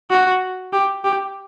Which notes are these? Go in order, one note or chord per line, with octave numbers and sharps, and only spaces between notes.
F#4
G4
G4